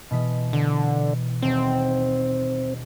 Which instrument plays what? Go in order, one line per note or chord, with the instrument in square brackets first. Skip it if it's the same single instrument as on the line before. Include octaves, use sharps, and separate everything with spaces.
[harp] B2 E3 B6
[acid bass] D3
[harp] D#1 [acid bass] C4